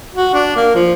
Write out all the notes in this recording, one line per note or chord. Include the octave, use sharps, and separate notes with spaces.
F#4
D4
A#3
F3